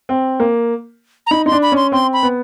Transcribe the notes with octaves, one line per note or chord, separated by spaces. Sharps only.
C4
A#3
A#5
D#4 B5
D#4 C6
D4
B5
C#4 C6
C4 C6
B5
B3